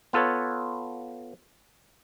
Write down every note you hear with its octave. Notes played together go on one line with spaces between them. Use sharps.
B3 F4 A4 B4 C#5